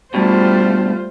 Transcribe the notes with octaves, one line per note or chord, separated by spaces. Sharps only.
G2 B2 G3 A3 F4 C5